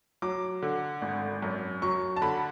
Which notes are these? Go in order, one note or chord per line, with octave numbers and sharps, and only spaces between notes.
F#3 D6
D3
G#1
F#2
F#3 C#6
A5
D3 B5